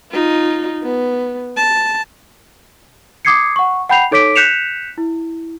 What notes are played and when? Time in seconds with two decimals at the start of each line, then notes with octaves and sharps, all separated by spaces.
0.12 D#4 F4
0.84 B3
1.57 A5
3.25 D6 D#6 G#6 C7 C#7
3.56 F#5 C#6
3.89 F#5 G5 B5 G6 C7 F7
4.11 D#4 A4 C#5 D6 B6 D7
4.36 F#6 G6 B6 C#7 E7 F7
4.98 E4